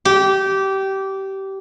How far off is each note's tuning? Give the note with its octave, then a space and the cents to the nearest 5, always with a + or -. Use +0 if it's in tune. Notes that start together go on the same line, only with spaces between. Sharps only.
G4 -20